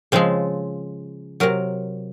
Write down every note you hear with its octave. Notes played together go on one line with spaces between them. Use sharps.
C#3 F3 G#3 C4
C3 F#3 A#4